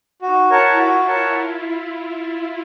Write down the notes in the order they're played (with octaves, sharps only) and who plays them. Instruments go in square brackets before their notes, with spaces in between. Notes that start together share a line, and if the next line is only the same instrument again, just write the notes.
[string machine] D#4 [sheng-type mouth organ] F#4
[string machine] E4 [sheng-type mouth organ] A#4 C#5 F#5 A5
[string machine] F4 [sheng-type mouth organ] F#4
[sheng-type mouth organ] A#4 C#5 F#5 A5